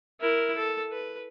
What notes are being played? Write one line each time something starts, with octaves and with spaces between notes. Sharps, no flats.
E4 A#4
A4
B4